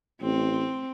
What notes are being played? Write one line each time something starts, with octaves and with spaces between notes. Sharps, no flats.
A1 C4